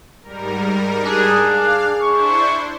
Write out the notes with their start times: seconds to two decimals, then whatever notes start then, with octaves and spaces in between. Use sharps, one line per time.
0.22 G#2 G3 A#4
1.05 D4 G#4
1.39 F5
2.02 D4 E4 C5 C#6